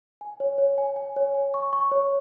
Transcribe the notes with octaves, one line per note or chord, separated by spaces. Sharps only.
G#5
C#5
C#5
G#5
G#5
C#5
G#5
C#6
C#6
C#5